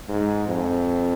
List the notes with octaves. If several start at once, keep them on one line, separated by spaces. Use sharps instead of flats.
G#2
F2